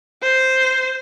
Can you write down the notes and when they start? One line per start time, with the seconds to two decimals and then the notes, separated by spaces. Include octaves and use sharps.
0.23 C5